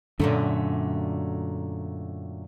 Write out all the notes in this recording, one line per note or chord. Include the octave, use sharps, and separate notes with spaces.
F#2 A#2 D3 F#3 A3